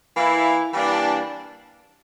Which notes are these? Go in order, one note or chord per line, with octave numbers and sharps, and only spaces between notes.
E3 A#3 E4
E3 G3 A#3 D4